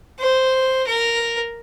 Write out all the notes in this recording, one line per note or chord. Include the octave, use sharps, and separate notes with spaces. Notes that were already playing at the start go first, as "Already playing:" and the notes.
C5
A#4